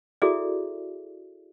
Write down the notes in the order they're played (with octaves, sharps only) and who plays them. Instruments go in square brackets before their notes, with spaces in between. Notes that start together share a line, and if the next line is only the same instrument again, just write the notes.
[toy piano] E4 F#4 G#4 A4 D5 E5